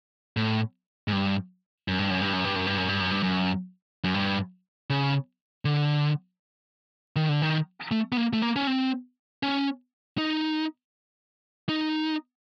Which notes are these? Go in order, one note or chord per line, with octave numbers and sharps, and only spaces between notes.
A2
G#2
G2
F#2
G2
F#2
G2
F#2
G2
F#2
G2
F#2
G2
F#2
G2
F#2
F#2
G2
C#3
D3
D#3
D3
D#3
A3
B3
A#3
A3
A#3
C#4
C4
C#4
D#4
D#4